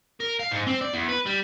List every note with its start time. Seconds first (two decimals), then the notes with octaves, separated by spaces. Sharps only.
0.20 A#4
0.39 F5
0.52 G#2
0.67 C4
0.81 D5
0.93 E2
1.08 B4
1.26 G3